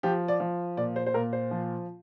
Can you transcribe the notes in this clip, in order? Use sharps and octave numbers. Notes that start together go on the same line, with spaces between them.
F3 G4
D5
F3
A#2 D5
C5
C5
A#2 A#4
C5
F3